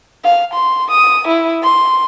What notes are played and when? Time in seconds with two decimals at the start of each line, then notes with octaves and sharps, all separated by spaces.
0.24 F5
0.54 C6
0.91 D#6
1.28 E4
1.63 C6